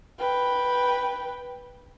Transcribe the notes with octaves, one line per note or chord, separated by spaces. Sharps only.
B4 G5